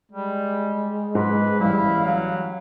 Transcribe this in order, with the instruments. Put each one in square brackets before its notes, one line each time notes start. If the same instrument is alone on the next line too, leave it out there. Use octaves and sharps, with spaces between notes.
[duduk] G3 [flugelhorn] G#3
[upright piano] G#2 [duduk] B4
[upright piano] A1 G3 [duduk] E4 [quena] F5
[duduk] F#3